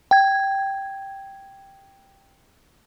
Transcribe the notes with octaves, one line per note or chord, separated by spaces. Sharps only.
G5 G#6